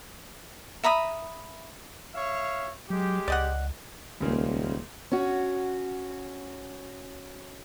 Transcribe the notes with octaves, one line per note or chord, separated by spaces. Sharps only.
E5 A#5 B5 D#6
C#5 E5 F5
F#3 G#3 G4
C#2 D5 D#5 F#5
D#1 C#2 C#3 A#3
C#4 F#4